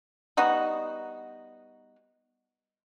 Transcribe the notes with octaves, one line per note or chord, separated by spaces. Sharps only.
G3 B3 D#4 F#4